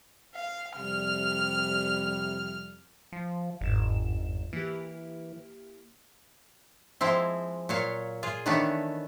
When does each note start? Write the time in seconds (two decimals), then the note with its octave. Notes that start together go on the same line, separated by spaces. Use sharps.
0.35 F5
0.76 F2 C3 G3 F6
3.13 F3
3.61 G1 E2 G#2 E7
4.53 E3 A#3 E4 G4
7.01 F3 G#3 C4 E4
7.69 A#2 F#3 C#5 F5
8.23 F4 G#4
8.46 D#3 E3 A3 B3 C#4 D4